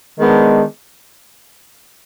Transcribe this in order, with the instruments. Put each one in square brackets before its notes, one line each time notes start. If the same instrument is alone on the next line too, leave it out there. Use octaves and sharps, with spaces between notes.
[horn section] D#3 G#3 B3 D4